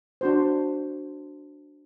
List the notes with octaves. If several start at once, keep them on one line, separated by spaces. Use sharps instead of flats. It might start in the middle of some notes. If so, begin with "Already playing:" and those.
D4 F#4 C5